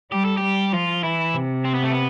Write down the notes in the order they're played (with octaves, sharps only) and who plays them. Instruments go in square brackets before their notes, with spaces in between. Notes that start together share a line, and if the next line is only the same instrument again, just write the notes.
[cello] G3 [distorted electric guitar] G4
[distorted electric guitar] A4
G4
[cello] G3
[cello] F3 [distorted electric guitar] F4
[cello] E3 [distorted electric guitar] E4
[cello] C3
[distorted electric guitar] C4
B3
A3
B3